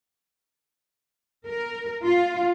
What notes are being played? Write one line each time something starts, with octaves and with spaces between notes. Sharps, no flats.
A#4
F4